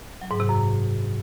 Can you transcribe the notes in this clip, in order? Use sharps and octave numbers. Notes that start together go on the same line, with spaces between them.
F#3
G#2
C3
F#2